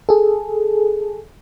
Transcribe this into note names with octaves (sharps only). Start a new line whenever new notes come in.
G#4 A4